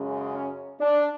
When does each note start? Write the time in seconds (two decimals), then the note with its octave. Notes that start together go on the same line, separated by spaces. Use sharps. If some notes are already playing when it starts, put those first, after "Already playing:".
Already playing: F#2 C#3 G#3 C#4
0.34 C#4
0.80 D4